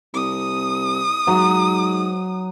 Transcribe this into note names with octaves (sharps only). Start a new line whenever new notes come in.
C2 D#6
G#2 F#3